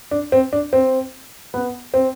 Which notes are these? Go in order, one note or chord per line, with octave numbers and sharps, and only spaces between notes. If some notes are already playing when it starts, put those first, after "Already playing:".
D4
C4
D4
C4
B3
C4